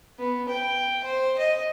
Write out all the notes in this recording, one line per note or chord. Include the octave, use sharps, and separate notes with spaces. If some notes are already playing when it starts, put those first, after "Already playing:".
B3
G5
C5
D#5